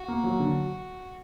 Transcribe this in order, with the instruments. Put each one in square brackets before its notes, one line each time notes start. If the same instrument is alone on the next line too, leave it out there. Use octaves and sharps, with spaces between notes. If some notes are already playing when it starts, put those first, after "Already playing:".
Already playing: [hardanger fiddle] F#4
[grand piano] A#3
F#3
D3